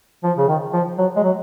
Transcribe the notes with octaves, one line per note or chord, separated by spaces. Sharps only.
F3
C#3
D#3
F3
F#3
G#3
F#3